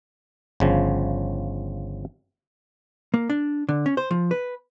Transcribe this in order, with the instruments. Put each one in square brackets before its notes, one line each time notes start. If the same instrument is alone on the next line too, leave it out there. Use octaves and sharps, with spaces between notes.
[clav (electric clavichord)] G1 C#3 F3
[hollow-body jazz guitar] A#3
D4
D3
C#4
C5
F3
B4